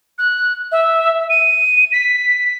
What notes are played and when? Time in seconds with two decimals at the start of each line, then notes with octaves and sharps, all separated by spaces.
0.18 F#6
0.72 E5
1.30 D#7
1.92 B6